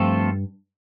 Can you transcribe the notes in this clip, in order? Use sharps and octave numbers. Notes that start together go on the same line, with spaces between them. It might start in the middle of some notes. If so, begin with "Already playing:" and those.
Already playing: G2 F3 A3 C4 F4 A4